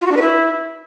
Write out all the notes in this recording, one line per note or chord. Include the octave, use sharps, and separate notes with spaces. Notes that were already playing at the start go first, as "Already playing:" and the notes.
F4
F#4
D4
B4
E4